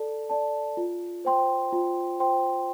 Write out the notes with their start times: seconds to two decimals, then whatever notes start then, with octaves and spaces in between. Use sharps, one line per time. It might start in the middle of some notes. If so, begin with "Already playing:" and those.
Already playing: A4 D5 A5
0.30 D5 A5
0.77 F4
1.25 C5 G5 C6
1.73 F4
2.20 C5 G5 C6